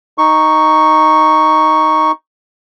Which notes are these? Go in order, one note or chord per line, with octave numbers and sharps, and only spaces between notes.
D#4 C#6